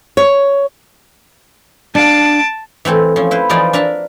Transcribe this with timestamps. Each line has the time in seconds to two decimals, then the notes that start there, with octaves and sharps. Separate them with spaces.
0.17 C#5
1.95 D4 F5 A5 D7
2.85 E3 A3 C4 A4
3.16 F3 C#4
3.31 E4 B4 C5
3.49 E3 F3 D#4 F4 G#4 D5
3.73 D4 A#4 E5 A5